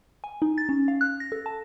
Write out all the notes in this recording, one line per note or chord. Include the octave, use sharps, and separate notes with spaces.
G#5
D#4
A6
C#4
F5
F#6
A#6
A4
A5